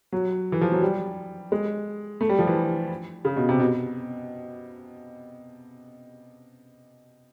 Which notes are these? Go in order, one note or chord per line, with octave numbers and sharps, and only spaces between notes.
F#3
E3
F3
F#3
G3
G#3
A3
G3
F3
E3
C#3
B2
C3
B2